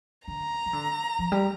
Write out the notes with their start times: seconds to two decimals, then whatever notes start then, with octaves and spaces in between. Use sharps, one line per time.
0.27 D3 A#5
0.66 F3
0.73 D3
1.19 F3
1.32 G3